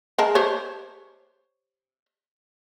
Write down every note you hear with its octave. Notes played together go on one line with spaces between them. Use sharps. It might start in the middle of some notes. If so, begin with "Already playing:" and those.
G#3 A#4 A5
G4 C5 C#5